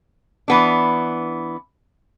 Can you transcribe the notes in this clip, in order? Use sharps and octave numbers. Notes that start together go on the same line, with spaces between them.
E3 B3 D4